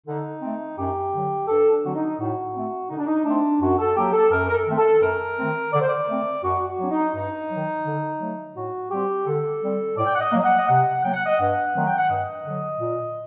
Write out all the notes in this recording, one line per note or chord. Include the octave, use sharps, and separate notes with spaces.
D3 D#4
A3 C4
F#2 G4
D3 F#3
G2 A4
D4
D3 F#3 C4 F#4
D#4
A2 F#4
A3 C4
D3 D#4
D4
D#4
A3 C4 D4
F#2 F#4
A4
F#3 A#3 G4
A4
F#2 A#4
A#4
A4
D#3 A3 C4
A4
F#2 A#4
D#3 A3 C4
D3 D5
C5
D5
A3 C4
F#2 F#4
F#4
F#3 C4 D4
D#4
G2 D#4
D#3 F#3
D3
F#3 A3
A2 F#4
G3 C4 G4
D3 A4
G3 C4
A2 D5
G5
F#5
D#5
F#3 A#3
D#5
F#5
D#5
C3 F#5
F#3 A#3 G5
F#5
D#5
G2 F#5
D#3 F#3 A3 C4
G5
F#5
G2 D#5
D3 F#3
A#2